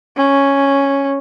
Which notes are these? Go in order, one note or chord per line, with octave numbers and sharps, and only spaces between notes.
C#4